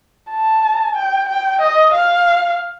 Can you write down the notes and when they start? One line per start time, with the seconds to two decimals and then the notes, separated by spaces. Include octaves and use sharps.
0.30 A5
0.96 G5
1.29 G5
1.61 D#5
1.94 F5